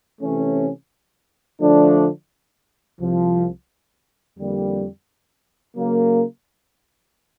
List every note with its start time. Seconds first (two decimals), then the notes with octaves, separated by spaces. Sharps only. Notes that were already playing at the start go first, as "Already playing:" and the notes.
0.22 C3 E3 A3 C#4
1.60 D3 F3 A3 D4
2.99 C2 C3 F3
4.37 F2 D3 G3 A#3
5.75 C#3 F#3 A#3